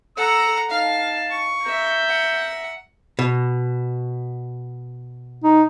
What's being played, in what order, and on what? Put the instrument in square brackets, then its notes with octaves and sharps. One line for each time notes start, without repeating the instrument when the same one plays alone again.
[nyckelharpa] A4 [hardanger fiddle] F#5 A#5 [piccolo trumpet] E6
[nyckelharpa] D#4 [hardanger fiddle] F5 [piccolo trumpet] A5
[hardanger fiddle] C#6
[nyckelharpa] E5 A#5 [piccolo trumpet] G6
[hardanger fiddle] F#5
[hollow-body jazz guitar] B2
[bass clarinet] D#4